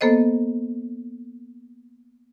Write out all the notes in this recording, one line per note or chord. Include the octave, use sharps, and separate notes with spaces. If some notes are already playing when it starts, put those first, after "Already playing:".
A#3 B3 A4 C5 D#5